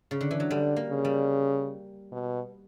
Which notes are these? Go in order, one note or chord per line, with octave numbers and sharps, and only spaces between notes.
C#3
D3
E3
F#3
D3 G3
A#3
C#3
G3
B2